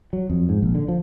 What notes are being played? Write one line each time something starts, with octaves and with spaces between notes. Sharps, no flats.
F#3
F2
G#2
A#1
D3
F3